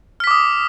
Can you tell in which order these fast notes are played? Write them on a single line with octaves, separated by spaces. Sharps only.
F6 B6 D6 D#6